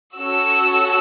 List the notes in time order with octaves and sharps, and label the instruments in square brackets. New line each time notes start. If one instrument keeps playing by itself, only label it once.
[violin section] C#4 F#4 A4 E6